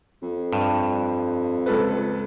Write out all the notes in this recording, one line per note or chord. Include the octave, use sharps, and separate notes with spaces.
F2
G2
C#2 A4 B4